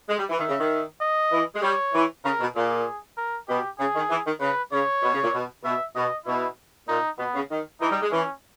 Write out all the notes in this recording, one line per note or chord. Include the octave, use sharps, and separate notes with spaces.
G#3
G3
E3
D#3 E5
C#3
D#3
D#5
E3
G#3
G3 C#5
E3
C#3 A#4
B2
A#2 G#4
A#4
B2 G4
C#3 G#4
D#3
E3
D#3
C#3 B4
C#3 C#5
B2
C#3
A#2
B2
B2 E5
B2 D#5
B2 E4
A#2 D#4
B2 B3
C#3
D#3
E3 D#4
G3
G#3
E3 C#4